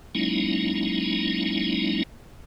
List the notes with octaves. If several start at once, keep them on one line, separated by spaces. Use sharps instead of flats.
F#3 G#3 A#3 C#4 D#4 E4